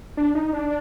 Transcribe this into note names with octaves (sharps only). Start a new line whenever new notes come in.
D4
D#4
D4